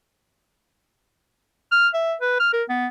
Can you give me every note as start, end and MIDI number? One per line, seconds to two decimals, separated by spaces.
1.72 1.88 89
1.94 2.15 76
2.21 2.37 71
2.40 2.50 89
2.53 2.63 70
2.69 2.87 59